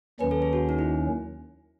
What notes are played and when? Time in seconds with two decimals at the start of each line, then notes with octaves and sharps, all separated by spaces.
0.20 D#2 D#3 F#3 C#4 B4
0.31 A4
0.42 G#4
0.53 F#4
0.69 D#4
0.79 E4